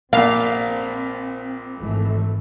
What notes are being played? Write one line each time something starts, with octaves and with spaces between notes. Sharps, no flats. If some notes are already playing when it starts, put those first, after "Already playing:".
A#1 A#2 C4 F5
G#1 E3 A3